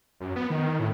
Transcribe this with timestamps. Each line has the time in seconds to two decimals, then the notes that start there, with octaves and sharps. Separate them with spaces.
0.20 F#2
0.36 B3
0.50 D#3
0.79 A2